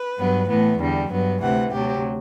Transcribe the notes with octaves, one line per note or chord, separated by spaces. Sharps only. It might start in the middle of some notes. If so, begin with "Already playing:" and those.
Already playing: B4
G2 F#3 B3
A2 E3 B3
E2 D3 G3
G2 F#3 B3
D2 C3 E3 F#5
D2 C3 F#3 G4